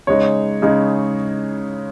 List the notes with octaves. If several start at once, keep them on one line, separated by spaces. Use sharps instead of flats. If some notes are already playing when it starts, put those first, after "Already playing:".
C#3 G#3 D#4 C#5
C#3 G#3 D#4